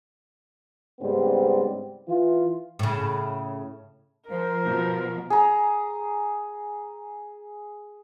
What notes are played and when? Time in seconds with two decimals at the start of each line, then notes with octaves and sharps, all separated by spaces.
1.00 G#2 C#3 G3 B3 C4
2.08 E3 F4
2.79 A2 C#3
4.30 F3 A#4 C5
4.65 B2 F3
5.30 G#4 A#5